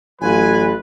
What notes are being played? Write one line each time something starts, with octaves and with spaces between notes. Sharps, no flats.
A1 F#3 F4 B4 G#5